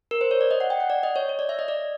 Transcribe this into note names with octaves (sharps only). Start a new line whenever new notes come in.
A#4
C5
C#5
D5
D#5
F#5
G5
F#5
D5
D#5
C#5
C#5
D5
E5
D#5
D5